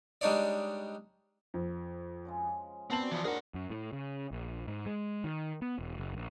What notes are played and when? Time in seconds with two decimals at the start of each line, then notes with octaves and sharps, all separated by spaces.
0.21 G3 G#3 D4 D#4 C#5 D5
1.54 F2
2.25 C#3 F3 G#3
2.90 B3 C4 D4 F#4 A#4 A5 F#7
3.11 G#2 E3 F3 E4
3.24 A2 D4 F#4 G#4 A#4 F#5 A5
3.54 F#2
3.70 A2
3.93 C#3
4.31 A#1
4.67 G#2
4.86 G#3
5.24 D#3
5.62 B3
5.79 E1
5.98 F#1
6.13 A#1